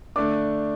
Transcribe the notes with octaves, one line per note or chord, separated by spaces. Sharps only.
D3 A3 D4 D6